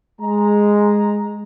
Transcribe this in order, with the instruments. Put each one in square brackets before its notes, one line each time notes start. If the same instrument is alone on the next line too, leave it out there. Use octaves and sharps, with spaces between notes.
[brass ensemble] G#3 A#5